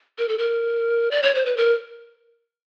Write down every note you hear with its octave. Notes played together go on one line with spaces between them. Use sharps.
A#4
A4
A#4
D5
C#5
C5
B4
A#4